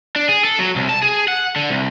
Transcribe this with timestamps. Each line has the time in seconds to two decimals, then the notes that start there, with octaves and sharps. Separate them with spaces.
0.16 D4
0.29 G#4
0.45 A4
0.59 F#3
0.76 C2
0.89 A5
1.03 G#4
1.28 F#5
1.56 D3
1.70 C2